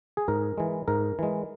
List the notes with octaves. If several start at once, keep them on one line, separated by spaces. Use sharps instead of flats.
G#4
G#2 A#4
E3 G#3
G#2 A#4
E3 G#3